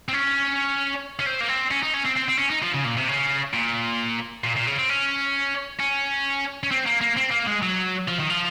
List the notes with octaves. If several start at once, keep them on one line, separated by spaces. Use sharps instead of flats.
C4
C#4
C#4
C4
A#3
C4
C#4
D#4
C#4
C4
C4
C4
C#4
D#4
F3
C#3
A#2
C3
C#3
A#2
A#2
A#2
C#3
C4
C#4
C#4
C#4
C4
A#3
A#3
C4
A#3
G#3
F#3
F3
D#3
F3